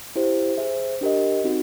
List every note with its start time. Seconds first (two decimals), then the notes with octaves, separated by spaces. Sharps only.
0.16 E4 G4 C5 F5
0.57 G#4 C5 E5
1.01 D4 G4 A#4 D#5
1.44 C4 D#4 F#4